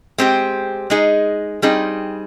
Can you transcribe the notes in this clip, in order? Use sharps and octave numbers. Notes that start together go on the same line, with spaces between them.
G#3 C4 G4
G#3 D#4 G#4
G3 C4 D#4 G#4